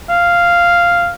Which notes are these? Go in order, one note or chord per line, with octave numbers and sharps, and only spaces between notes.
F5